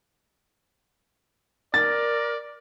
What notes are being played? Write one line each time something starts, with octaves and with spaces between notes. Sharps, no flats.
A#4 D5 A6